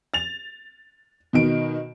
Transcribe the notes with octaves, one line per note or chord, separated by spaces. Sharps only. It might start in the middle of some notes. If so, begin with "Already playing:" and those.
A6 F7
B2 D#3 D7